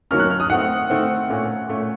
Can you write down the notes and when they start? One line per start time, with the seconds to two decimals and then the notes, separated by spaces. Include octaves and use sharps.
0.11 D#3 F#3 A#3 C#4 F6
0.20 F#6
0.30 F6
0.40 D#6
0.50 D#3 A3 C4 F#5
0.90 D#3 A3 C4
1.29 A#2 A3 C#4
1.69 A#2 A3 C#4